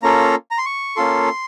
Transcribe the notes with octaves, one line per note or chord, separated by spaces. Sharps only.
A#3 C#4 F4 A4 A#5
A#5
C6
C#6
A#3 C#4 F4 A4 C6